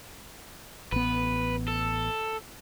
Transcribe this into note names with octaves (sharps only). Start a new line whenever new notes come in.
A1 B3 B4
A4